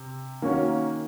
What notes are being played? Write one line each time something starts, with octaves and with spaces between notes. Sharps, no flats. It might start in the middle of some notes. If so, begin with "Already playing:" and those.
Already playing: C3
D#3 A#3 C#4 F#4